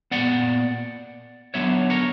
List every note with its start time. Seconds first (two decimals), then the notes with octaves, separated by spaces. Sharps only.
0.11 A#2 F#3 B3 D5 F#5
1.54 D3 F#3 B3 C#5 E5
1.90 A#4 C#5